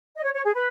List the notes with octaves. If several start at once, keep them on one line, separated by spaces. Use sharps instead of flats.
D#5
C#5
C#5
G#4
B4